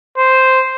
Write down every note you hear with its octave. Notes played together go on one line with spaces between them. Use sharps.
C5